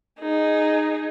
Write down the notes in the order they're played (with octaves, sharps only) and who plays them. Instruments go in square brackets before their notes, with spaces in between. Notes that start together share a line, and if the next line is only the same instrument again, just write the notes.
[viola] D#4 G#4